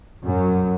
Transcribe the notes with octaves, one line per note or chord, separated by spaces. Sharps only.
F#2